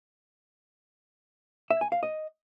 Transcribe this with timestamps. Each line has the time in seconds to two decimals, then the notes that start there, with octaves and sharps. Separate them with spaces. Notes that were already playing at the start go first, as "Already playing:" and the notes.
1.70 E5
1.81 G#5
1.92 F5
2.03 D#5